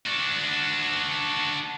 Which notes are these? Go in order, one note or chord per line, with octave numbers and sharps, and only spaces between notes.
D4 F#4